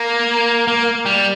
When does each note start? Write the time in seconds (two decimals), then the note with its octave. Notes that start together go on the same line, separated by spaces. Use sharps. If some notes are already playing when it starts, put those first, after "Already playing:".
Already playing: A#3
0.68 A#3
1.06 G3